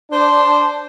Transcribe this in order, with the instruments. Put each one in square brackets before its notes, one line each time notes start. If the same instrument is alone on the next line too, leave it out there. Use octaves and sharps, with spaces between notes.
[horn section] D4 C5